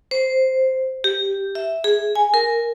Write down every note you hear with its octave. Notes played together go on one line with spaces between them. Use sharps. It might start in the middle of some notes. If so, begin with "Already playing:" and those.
C5
G4
E5
G#4
G#5
A#4